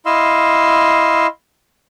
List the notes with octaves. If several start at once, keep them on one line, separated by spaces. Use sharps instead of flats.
E4 D#5 F5 C6 E6